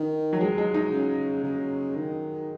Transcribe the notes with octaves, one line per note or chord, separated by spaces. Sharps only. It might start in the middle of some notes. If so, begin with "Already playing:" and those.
Already playing: D#3
F#3
G#3
G#3
D#4
C#3
C#3
D#3